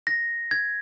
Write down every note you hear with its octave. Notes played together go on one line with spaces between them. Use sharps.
A#6
G#6